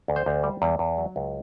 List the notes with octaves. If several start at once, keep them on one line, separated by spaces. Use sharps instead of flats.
D2
C5
D2
G3
E2
E2
F#3
C#2